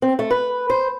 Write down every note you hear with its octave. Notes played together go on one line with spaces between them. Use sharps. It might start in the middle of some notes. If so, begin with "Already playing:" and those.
C4
A3
B4
C5